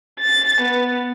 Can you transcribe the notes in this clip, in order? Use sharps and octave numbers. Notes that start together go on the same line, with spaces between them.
A6
B3